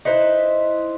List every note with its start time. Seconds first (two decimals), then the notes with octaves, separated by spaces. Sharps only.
0.05 D#4 E4 B4 C5